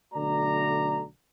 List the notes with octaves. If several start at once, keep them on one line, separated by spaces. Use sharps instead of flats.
B1 D3 A3 F#4 D5 A#5